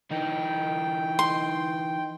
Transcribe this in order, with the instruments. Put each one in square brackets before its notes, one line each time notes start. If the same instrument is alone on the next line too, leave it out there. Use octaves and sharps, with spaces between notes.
[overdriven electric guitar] E3 D#4 [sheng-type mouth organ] G5
[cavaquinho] C6